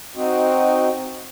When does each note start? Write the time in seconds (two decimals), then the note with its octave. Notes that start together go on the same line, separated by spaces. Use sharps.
0.16 C4 D#4 F#4